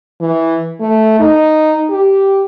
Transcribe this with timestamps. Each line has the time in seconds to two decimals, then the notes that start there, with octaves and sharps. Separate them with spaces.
0.21 E3
0.80 A3
1.20 D#4
1.90 G4